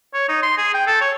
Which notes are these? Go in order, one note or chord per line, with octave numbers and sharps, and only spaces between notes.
C#5
D#4
C6
G#4
G5
A4
C#5